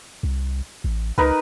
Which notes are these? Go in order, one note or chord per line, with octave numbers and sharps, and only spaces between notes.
C2
A1
C#2 D#4 A#4 B4